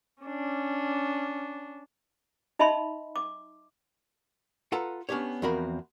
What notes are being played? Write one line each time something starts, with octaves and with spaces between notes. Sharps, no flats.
C#4 D4
D#4 D#5 E5 A5 B5 C6
D6
F4 A4 B4 F#5 A#5
B3 C#4 D4 G4 C#5
E2 F3 C4 F#4 A#4 B5